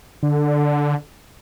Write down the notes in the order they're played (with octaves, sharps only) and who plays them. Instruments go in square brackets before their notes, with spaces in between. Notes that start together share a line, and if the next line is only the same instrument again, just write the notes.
[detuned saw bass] D3